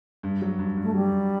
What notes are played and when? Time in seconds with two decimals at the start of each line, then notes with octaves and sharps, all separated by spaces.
0.23 G2
0.42 F#3
0.59 G2
0.77 G2
0.83 A3
0.95 F#3 G3
1.12 G2